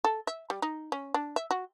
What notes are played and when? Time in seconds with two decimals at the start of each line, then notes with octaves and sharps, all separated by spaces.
0.04 A4
0.27 E5
0.50 G3
0.62 D#4
0.92 C#4
1.14 D4
1.36 E5
1.51 F#4